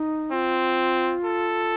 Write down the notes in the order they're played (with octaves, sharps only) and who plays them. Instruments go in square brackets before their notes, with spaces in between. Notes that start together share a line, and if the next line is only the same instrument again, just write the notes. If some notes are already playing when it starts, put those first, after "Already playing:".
Already playing: [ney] D#4
[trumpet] C4 [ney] F4
[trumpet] A4